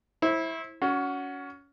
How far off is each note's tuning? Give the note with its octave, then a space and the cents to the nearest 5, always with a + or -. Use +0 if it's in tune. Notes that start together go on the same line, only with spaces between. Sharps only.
E4 -15 C5 +30
C#4 +20 F#4 -5